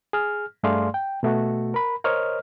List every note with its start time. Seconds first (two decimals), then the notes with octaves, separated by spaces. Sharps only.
0.13 G#4 F6
0.63 G2 A3 G#4 D5 F5 C6
0.94 G5
1.23 B2 A3 F#4
1.74 A#4 B5
2.04 A#4 C5 C#5 D#5 F6